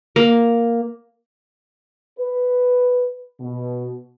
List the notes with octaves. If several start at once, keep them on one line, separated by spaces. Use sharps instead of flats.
A#3
B4
B2